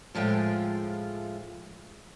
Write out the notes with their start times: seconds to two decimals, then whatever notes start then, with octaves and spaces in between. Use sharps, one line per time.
0.15 A2 F3 G#3 F4 G5